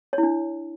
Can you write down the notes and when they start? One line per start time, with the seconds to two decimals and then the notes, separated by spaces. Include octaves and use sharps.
0.13 C#5
0.18 E4
0.23 D4